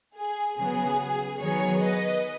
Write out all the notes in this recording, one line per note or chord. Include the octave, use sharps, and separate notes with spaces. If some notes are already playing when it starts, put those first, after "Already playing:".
G#4
C#3 F#3 B3 G#4
D#3 F#3 B3 G#4 C#5
B4 D#5